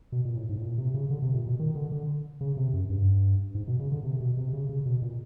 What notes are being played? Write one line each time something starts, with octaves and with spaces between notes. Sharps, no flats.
B2
A#2
A2
G#2
A2
A#2
C3
C#3
D3
C3
A#2
B2
D#3
D3
D3
C#3
C3
F#2
G2
G#2
B2
C#3
D3
C3
B2
C3
C#3
C#3
B2
A#2